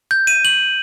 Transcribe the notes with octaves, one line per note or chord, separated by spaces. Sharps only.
G6
D#7
F#7